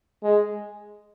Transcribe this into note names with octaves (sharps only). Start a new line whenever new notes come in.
G#3